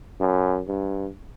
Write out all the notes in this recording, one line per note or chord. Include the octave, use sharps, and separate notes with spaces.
F#2
G2